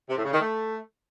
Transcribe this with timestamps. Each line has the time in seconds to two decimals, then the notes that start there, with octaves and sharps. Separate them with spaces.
0.10 C3
0.17 A2
0.25 C#3
0.33 D#3
0.40 A3